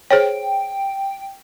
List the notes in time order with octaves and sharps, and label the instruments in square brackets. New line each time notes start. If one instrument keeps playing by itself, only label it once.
[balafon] G#4 C5 C#5 [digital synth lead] G5